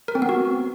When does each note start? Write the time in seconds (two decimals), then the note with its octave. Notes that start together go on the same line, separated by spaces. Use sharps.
0.08 A#4
0.15 C4
0.22 B3
0.29 F#4